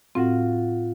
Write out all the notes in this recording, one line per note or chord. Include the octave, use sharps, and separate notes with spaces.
A2 C4 F4 F#4